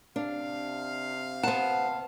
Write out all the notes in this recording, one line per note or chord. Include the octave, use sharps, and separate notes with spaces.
C3 D4 F5
B3 C5 F#5 A5